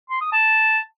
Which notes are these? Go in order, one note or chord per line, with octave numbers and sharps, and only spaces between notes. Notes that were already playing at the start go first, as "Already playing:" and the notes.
C6
D#6
A5